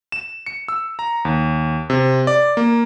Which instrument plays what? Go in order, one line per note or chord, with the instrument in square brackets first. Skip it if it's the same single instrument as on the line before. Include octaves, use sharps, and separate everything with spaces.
[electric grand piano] E7
C#7
E6
A#5
D#2
C3
D5
A#3